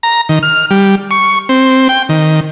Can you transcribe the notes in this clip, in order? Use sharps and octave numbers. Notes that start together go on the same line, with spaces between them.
A#5
D#3
F6
G3
C#6
C4
G5
D#3